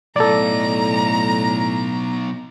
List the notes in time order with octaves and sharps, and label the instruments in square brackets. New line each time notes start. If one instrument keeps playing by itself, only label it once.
[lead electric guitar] B1 [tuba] A2 [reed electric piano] A4 D5 [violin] A#5